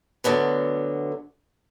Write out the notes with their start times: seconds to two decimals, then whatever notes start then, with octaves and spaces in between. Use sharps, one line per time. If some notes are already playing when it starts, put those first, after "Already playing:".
0.24 D2 D3 F#3 B3